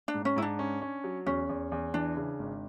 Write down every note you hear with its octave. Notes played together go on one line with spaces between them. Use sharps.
D4
G#2
C#4
G#2 E4
D4
C#4
C#4
F#3
E2 C#4
E2
E2
E3 D4
C#3
G#1